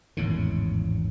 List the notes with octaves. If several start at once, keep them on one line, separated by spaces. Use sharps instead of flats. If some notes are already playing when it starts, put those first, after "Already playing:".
G#1 E2 A2 C#3